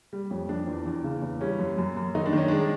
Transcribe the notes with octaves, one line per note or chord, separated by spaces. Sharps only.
G3
F2 C#4
F2 D4
E2
E2
C#3
E2
G3 C#4
F#2
F#2
F#2
D#3 D#4
D4
D#3 C#4
G#3 D4